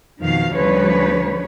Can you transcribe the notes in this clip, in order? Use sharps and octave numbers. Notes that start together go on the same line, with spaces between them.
F2 B2 D#3 F3 F5
D2 C#3 F3 G3 B4 C#5